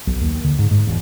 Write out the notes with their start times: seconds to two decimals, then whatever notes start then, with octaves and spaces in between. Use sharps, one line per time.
0.07 B1
0.21 D#2
0.44 D3
0.59 G#2
0.71 G#2
0.87 E1